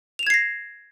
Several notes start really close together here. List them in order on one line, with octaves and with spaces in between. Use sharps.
F7 E7 G#6 C7 A#6